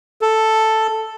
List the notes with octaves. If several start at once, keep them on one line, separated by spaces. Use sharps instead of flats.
A4